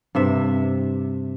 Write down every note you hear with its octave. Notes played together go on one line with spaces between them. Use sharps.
G2 C3 E5